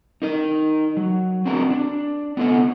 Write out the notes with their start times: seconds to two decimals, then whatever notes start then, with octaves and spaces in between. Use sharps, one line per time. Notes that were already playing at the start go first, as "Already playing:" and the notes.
0.22 D#4 A#4 D#5
0.97 F#3
1.46 C4 D4 F#4 G#4 A#4
1.70 D4
2.37 B3 F4 A4 C5 D#5 F#5